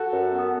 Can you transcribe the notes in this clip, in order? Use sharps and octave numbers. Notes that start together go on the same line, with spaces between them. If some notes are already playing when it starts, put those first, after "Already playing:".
Already playing: F#4 A4
F#2
B3